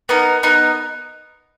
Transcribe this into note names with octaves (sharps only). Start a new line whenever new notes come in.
B3 D#4 A#4
B3 D#4 A#4